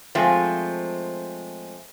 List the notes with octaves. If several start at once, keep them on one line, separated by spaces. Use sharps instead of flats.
F3 G#3 A3 C4